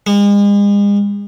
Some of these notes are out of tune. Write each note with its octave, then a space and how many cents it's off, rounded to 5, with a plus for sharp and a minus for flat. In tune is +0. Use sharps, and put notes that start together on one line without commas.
G#3 -40